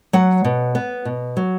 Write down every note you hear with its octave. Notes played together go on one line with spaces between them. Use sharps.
F#3 F#5
B2
B3
B2
F#3